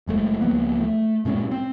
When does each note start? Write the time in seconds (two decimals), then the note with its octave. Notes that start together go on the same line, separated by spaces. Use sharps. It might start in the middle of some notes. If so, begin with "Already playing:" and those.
0.07 F#1 G#3 A3
0.41 C#2 F3 A#3 B3
0.81 A3
1.25 G2 A#2 G#3 C#4
1.51 C4